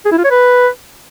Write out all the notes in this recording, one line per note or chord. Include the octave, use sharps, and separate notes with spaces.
G#4
E4
F4
C#5
B4